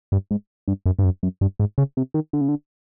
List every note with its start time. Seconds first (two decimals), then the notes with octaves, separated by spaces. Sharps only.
0.12 G2
0.31 G#2
0.68 G2
0.86 F#2
0.99 G2
1.04 F#2
1.23 F#2
1.41 G2
1.59 G#2
1.78 C#3
1.97 C3
2.14 D#3
2.33 D3
2.41 C#3
2.49 D3